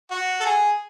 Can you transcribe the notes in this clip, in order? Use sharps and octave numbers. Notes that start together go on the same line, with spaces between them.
F#4
A4
G#4